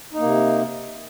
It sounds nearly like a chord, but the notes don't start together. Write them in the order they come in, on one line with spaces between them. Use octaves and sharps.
D#4 A#3 C3